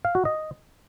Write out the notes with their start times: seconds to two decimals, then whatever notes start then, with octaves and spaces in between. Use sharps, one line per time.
0.05 F5
0.15 F#4
0.25 D#5